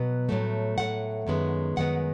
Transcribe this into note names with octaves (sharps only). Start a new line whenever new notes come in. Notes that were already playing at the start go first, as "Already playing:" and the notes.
Already playing: B2 F#3 B3
A2 F#3 A3
A2 F#3 A3 F#5
F#2 D#3 G#3 B3
F#2 D#3 G#3 B3 F#5